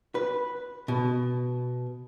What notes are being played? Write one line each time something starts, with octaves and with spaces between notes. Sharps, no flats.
B4
B2